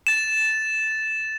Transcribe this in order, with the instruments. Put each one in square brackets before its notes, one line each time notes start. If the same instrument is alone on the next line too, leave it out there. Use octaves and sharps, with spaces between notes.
[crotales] A6 E7